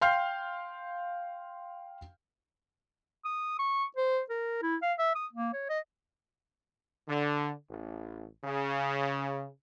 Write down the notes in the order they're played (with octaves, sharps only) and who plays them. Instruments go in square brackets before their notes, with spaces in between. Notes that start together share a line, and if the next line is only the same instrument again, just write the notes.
[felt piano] F5 G5 C6 F6 G6 C7
[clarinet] D#6
C#6
C5
A#4
E4
F5
E5
D#6
A#3
C#5
D#5
[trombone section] D3
A1
C#3